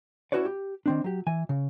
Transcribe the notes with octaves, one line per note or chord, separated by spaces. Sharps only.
C#4 E4 F#4 B4 C#5 D5
G4
D#3 C4 D4
F#3 G4
E3 G#5
C#3